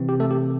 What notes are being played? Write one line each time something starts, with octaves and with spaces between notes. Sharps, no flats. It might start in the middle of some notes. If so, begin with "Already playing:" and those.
Already playing: C3 E3 C4
G4
A3 A4
G4